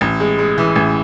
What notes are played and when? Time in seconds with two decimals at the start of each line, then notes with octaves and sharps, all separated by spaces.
0.01 A1
0.20 G#3
0.39 G#3
0.58 E3
0.76 A1